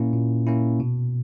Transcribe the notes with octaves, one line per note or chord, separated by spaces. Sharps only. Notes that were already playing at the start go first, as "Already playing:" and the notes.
Already playing: A#2 A#3 C#4 E4
A#2
A#3 C#4 E4
B2